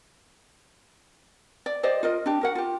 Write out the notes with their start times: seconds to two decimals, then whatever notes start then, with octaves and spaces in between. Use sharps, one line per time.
1.66 D5
1.83 G4 C5 D5 D#5
2.03 F4 A#4 D#5
2.26 D4 G4
2.41 F#4 A#4 F#5
2.55 F4 G4